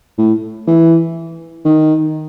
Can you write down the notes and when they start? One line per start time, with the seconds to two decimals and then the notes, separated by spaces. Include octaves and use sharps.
0.18 A2
0.67 E3
1.65 D#3